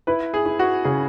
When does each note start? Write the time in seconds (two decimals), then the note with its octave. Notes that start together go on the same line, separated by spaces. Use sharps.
0.07 E4 B4
0.34 G#4
0.46 E4
0.59 F#4
0.85 C#3 G#4